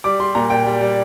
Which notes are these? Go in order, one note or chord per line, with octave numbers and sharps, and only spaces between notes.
G3 D6
G3 C6
A#2 A#5
A#2 G5
G3
G3